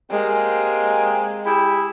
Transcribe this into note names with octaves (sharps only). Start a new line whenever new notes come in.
G#3 A#3 C4 G4
E4 G4 G#4